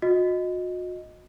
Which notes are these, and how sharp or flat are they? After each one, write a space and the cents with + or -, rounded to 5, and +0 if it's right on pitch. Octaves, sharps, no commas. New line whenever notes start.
F#4 -40 D#5 +0